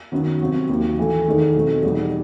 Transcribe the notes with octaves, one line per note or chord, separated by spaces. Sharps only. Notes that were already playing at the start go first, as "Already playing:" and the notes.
F#2 D#3 F#3 B3
C3 F#3 C4 F#4
D#2 D#3 F#3
A2 E3 A3 E4
E2 D#3 A3 D#4
B2 F#3 A3 C4 D#4
E2 B2 G3 D#4